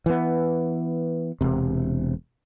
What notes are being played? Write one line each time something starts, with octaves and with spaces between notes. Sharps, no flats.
E3 B3
E1 C3